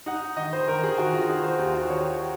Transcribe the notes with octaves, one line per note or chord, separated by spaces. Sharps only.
D#4 F#5
D#3 D#5
C5
D#3 A#4
G#4
D#3 F#4
F4
D#4 G#4
C5
D#2 F4
F#4
D#3 C#5